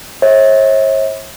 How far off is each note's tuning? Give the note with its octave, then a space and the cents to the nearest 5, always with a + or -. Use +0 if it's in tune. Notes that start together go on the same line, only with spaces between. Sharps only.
C#5 -40 E5 -35